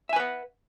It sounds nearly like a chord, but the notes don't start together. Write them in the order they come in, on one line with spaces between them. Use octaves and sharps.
E5 G#5 B4 F#5